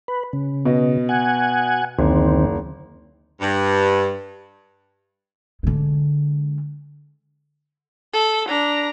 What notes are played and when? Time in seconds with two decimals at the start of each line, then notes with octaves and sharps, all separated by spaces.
0.08 B4
0.33 C#3
0.65 B2 D#5
1.09 F#5 G#5
1.99 F#1 D2 D#3 C4
3.41 G2
5.63 D3 G#3
8.13 A4
8.48 D4 A#5